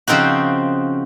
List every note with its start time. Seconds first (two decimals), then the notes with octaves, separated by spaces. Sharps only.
0.08 C#3 F3 C4 D#4 F#4